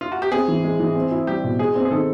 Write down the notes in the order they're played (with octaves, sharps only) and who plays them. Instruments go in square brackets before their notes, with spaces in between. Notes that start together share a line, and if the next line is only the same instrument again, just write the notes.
[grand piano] F4
F#4
G4
[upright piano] C4 [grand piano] G#4
[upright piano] E3
G#3
E3
C4
E4
[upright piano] G3 [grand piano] G4
[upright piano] B2
[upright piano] G#3 [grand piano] G#4
[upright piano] C4
[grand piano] G#4
[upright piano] D#3 [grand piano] A4